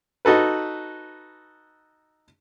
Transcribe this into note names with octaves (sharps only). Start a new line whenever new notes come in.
D#4 F#4 A4 B4